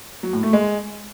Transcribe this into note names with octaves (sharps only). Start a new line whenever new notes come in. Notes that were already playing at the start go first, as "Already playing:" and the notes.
F#3
A2
A3
G#3